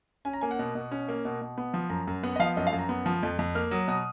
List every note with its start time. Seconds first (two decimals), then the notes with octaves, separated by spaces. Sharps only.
0.25 C#4 G#5
0.33 A#5
0.41 A#3 G#5
0.51 F#5
0.59 B2
0.75 B2
0.92 C#4
1.09 A#3
1.25 B2
1.41 B2
1.58 B3
1.74 F3
1.90 F#2 A#5
2.07 F#2
2.23 B3 F#5
2.36 D#5
2.39 F3 F5
2.57 F#2 D#5
2.67 F5
2.73 F#2
2.79 A#5
2.89 B3
3.06 F3
3.23 F2
3.39 F2
3.55 A#3 F6
3.71 F#3 D#6
3.88 B2 D#6